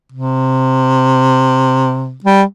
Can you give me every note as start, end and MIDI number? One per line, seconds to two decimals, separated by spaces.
0.12 2.17 48
2.24 2.42 55